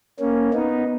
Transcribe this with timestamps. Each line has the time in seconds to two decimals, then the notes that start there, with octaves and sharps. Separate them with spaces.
0.19 A#3 C#4
0.53 B3 D#4